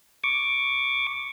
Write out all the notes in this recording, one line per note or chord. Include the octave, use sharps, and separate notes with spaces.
C#6 D6